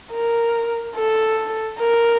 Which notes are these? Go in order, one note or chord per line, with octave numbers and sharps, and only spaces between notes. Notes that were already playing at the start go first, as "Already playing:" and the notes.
A#4
A4
A#4